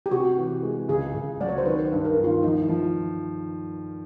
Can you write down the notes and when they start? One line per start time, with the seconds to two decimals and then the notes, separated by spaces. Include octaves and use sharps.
0.06 G4
0.11 C3 F#4
0.37 E3
0.63 G#3
0.89 C#2 G#4
1.14 C#2
1.40 F#3 D5
1.49 C#5
1.58 C5
1.66 D#3 B4
1.85 C5
1.92 G2
2.05 A#4
2.17 D#3
2.24 F4
2.43 F3 D#4
2.62 E4
2.69 F3